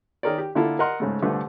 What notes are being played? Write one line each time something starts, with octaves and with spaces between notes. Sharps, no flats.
D#3 G#4 A#4 C#5 D5
G4
D3 A#3 E4 F4 A4
A#4 D#5 F#5 C6
G#2 C#3 A3
C2 D3 A3 F4 B4